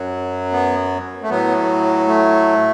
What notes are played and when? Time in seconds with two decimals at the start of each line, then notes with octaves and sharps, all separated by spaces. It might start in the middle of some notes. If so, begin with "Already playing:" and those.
Already playing: F#2 F#3
0.52 B3
1.23 A3
1.29 A2 F#3 B3
2.07 A3